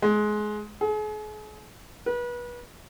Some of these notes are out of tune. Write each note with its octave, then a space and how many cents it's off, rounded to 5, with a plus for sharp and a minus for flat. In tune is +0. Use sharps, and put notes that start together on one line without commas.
G#3 +20
G#4 +40
B4 -30